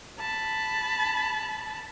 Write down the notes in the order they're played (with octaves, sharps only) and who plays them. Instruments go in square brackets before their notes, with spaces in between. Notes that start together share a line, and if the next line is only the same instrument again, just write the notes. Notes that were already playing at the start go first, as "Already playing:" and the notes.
[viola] A5 B5